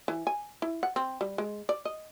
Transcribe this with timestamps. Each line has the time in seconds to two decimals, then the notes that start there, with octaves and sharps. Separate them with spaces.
0.08 E3
0.27 G#5
0.62 E4
0.83 F#5
0.96 C4
1.21 G3
1.38 G#3
1.69 D5
1.85 D#5